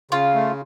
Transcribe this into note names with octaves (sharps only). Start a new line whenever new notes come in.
C#3 F4
A3